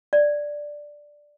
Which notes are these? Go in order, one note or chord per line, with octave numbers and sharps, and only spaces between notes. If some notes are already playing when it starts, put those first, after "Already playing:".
D5